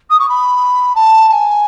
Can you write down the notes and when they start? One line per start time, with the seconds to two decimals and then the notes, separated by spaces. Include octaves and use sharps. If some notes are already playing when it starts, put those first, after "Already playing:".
0.10 D#6
0.19 C#6
0.29 B5
0.95 A5
1.29 A5
1.32 G#5